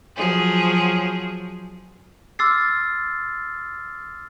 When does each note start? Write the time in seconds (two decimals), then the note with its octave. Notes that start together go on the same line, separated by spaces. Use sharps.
0.17 F3 F#3 G#4
2.39 C6 D6 E6 F6 A6 C7